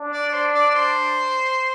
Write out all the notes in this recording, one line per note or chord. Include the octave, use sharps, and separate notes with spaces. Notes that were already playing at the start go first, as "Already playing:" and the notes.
Already playing: D4
D5
D5
C5
D5
D5
C5